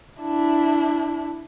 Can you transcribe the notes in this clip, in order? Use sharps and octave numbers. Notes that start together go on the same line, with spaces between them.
D4 E4